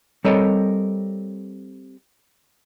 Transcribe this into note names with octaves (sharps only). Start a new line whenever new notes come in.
G3 C4 A4 A#4 C#5 D#5